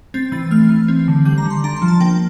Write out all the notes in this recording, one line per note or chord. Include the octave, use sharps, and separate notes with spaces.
C4 A6
E3 A6
A3 F6
E3
C4
D3
G3 G6
A#5
D3
C6
D4 A#5
C6
F3
A5
A#3 G5